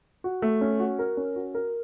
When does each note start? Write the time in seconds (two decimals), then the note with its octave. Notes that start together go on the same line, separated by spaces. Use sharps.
0.24 F#4
0.42 A3
0.61 C#4
0.80 F#4
0.99 A#4
1.17 C#4
1.36 F#4
1.55 A#4